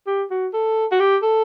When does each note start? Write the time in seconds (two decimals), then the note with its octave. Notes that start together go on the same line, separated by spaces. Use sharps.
0.07 G4
0.31 F#4
0.53 A4
0.92 F#4
1.00 G4
1.23 A4